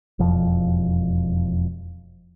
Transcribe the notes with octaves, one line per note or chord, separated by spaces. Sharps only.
E1 F2 F3